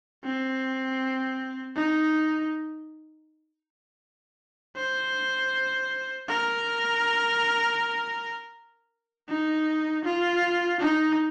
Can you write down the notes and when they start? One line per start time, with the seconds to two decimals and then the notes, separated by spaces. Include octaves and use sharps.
0.24 C4
1.76 D#4
4.76 C5
6.28 A#4
9.29 D#4
10.05 F4
10.80 D#4